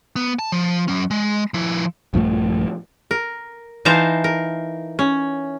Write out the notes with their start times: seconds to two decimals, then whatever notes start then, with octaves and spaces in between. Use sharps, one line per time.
0.16 B3
0.39 A5
0.52 F3
0.88 F#3 C#4
1.11 G#3
1.54 F3 E4
2.14 A#1 G2 F3 A3
3.11 A#4
3.85 E3 D#4 C5 F5 A5 A#5
4.24 A#4
4.99 C#4